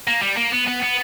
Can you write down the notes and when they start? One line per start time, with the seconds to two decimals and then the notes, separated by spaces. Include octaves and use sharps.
0.08 A#3
0.22 G3
0.37 A#3
0.53 B3
0.68 B3
0.83 B3